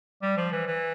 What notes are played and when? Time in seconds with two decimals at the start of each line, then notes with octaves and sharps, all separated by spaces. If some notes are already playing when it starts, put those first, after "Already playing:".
0.22 G3
0.37 F3
0.52 E3
0.67 E3